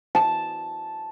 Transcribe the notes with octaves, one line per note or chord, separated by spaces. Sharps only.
A5